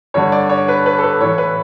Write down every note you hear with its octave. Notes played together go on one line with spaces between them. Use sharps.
G2 D3 C#5
D5
C#5
B4
B4
A4
B4
A2 E3 C#5
B4